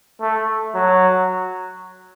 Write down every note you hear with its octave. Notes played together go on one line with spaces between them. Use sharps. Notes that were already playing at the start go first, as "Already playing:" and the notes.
A3
F#3